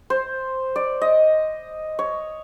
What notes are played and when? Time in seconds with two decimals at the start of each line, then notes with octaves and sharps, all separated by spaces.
0.10 C5
0.76 D5
1.01 D#5
1.99 C#5